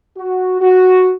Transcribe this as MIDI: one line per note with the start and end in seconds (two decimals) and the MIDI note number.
0.17 0.60 66
0.61 1.13 66